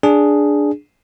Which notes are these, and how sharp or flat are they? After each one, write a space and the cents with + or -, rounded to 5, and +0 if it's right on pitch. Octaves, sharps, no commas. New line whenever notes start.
D4 +0 G#4 +0